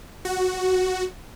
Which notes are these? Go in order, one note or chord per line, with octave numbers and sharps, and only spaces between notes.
F#4